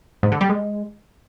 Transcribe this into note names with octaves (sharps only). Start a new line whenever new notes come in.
G#2
D3
G3
G#3